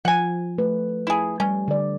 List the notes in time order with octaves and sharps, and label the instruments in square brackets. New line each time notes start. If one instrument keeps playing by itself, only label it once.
[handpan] F3 [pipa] F#5 G#5
[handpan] A3 B4
[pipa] E4 G#4
[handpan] G3 [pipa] C#4
[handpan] D3 D5